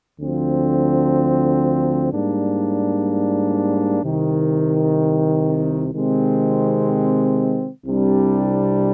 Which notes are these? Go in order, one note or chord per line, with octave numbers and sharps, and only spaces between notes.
D2 D3 F3 C4
G#2 G3 A#3 D4
C2 C3 D#3
C3 D#3 G#3 C4
C2 C3 G3 D4